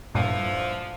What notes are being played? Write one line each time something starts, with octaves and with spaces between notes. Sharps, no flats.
G2 A#2 D3 E3 F3